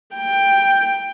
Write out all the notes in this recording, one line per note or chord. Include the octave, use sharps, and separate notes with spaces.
G5